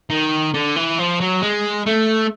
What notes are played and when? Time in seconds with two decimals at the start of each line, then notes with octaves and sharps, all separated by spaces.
0.10 D#3
0.54 D3
0.76 E3
0.99 F3
1.20 F#3
1.42 G#3
1.86 A3